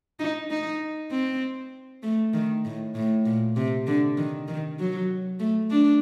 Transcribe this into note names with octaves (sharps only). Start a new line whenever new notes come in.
D#4
D#4
C4
A3
D#3
A2
A2
A#2
C3
D3
D#3
D#3
F#3
A3
D4